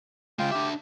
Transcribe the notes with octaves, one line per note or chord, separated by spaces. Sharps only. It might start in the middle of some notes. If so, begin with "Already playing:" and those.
C#3 G#3 F4 G5
D4 G4 E5